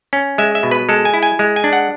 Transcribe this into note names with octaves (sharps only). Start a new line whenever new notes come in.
C#4
G#3 E5
E5
B2
B4
G#3 A4
G#5
E4
G#5
G#3
G#5
D4
F#5